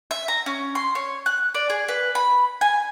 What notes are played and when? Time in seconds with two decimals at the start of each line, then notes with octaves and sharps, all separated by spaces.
0.11 E5
0.28 A#5
0.46 C#4
0.75 C6
0.95 C#5
1.26 F#6
1.55 D5
1.70 G#4
1.88 B4
2.15 B5
2.61 G#5